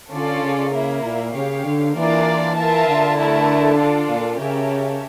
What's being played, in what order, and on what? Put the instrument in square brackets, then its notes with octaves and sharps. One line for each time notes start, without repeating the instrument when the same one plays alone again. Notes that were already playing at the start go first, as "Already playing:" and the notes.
[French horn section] D3 [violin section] C#4 F4 A4 D5
[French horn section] C#3
[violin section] A#3 E4 A#4 E5
[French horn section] A#2
[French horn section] C#3 [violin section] G4 C#5 F5
[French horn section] D3
[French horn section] E3 [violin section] A#3 D4 F4 A#4 D5
[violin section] F4 A#4 E5 A5
[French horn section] D3
[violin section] A3 E4 A#4 E5 A5
D4 F4 A4 D5
[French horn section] A#2
[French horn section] C#3 [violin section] C#4 G4 A#4 E5 A5